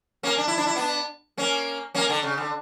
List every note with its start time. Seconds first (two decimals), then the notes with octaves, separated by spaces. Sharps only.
0.23 A#3 C#4
0.37 D4
0.48 E4
0.58 D4
0.66 E4
0.76 B3 D4
1.37 A#3 C#4
1.94 A#3 C#4
2.09 D3
2.23 C#3
2.37 D3